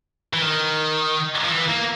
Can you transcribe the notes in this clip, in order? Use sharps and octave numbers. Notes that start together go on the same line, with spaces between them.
E3
D#3
F3
E3
A#3